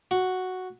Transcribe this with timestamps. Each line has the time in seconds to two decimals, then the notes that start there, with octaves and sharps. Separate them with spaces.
0.11 F#4